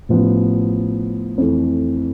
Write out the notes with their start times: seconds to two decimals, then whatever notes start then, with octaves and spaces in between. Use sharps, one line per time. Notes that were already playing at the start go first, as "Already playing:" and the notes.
0.09 A1 A2 F3 B3
1.38 F2 E3 A3